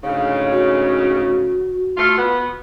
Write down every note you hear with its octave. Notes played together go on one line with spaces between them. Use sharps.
D2 G#2 C#3 F5
F#4
A3 F4
B3